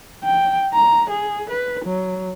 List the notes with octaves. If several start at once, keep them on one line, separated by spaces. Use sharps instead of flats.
G5
A#5
G#4
B4
F#3